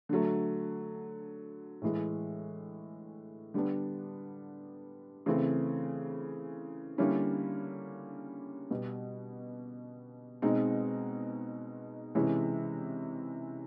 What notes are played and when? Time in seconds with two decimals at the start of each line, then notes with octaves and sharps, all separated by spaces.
0.09 D3 F#3 A3
1.82 A2 E3 G#3
3.54 D3 G3 B3 D4
5.26 C#3 E3 A3 C4
6.98 D3 G3 A#3 C#4 E4
8.70 B2 G3 B3
10.42 B2 G#3 C4 D#4
12.15 C3 E3 G#3 C#4 E4